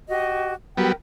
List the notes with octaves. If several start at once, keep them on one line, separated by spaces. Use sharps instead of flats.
F#4 G4 D#5
F#3 G3 B3 A#4 G5